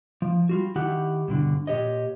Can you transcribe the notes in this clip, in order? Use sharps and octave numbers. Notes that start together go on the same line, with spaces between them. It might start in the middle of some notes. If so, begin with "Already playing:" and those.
F3
G3 F4 F#4
D#3 E4 G4 F#5
G2 B2 D3
A#2 C#3 G4 C#5 D#5